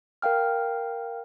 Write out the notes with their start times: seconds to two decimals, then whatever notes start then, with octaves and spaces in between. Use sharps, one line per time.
0.22 A#4 F5 G5 F6